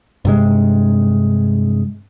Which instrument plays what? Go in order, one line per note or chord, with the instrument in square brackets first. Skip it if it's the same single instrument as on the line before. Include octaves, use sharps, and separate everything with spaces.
[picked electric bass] G2 C3 G#3